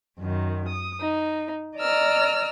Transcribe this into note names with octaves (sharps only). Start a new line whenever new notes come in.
F#2 D#3
D#6
D#4
D5 D#5 A#5 E6 F6